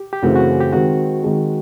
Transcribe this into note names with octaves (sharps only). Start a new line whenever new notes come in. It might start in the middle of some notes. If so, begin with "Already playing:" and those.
Already playing: G4
G4
F#2 C#3 E3 A3 C4 F#4
F#4
G4
D#3 G#3 C4 F#4
D#3 G#3 C4